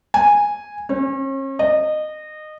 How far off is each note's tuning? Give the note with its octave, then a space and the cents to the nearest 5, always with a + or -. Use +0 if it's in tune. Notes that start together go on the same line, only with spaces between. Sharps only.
G#5 -10
C#4 -40
D#5 -20